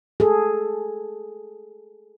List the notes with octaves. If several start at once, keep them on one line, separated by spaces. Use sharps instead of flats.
G#4 A4